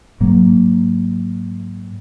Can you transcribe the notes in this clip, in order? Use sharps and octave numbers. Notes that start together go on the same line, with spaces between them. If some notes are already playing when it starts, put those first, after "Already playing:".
G#2 F#3 A#3